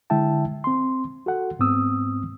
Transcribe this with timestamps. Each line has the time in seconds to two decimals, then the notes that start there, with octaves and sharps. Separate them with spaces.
0.10 D3 G#3 E4 E5 G5 A5
0.64 C4 C6
1.26 F#4 A4 F#5
1.59 G#2 B3 C4 D#6 E6